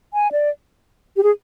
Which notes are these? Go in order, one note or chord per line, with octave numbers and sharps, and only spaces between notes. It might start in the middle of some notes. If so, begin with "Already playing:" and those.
G#5
D5
G4
G#4